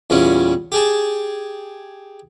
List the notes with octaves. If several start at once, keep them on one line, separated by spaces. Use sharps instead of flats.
E2 A#2 G3 C#4
G4 G#4 A5